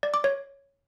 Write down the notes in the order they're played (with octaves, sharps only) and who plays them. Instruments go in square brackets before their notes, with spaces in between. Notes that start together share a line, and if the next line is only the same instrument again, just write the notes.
[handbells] D5
D6
C#5